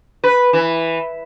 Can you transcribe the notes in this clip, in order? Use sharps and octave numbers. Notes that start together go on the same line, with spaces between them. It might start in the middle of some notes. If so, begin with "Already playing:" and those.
B4
E3